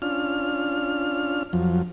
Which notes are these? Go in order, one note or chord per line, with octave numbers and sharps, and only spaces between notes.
C#4 D4 F4 F6
F2 F3 F#3